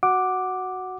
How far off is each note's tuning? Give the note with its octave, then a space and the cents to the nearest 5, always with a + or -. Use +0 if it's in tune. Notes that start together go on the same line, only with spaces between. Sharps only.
F#4 +0 F#5 +0 D6 +0